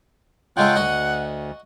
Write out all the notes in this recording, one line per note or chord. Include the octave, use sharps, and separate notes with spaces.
C#3 G#3 A3 F4 F#5 G5
D2 F#4 D#5